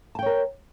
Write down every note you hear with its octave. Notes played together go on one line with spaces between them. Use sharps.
A#4 C#5 G5 A5